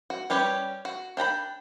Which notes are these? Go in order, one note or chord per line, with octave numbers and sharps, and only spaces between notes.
F#4
G3 C#4 G4 B4 C#5
F#4
D4 G5 A#5 B5